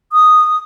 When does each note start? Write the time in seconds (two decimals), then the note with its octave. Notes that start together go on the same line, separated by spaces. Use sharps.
0.13 D#6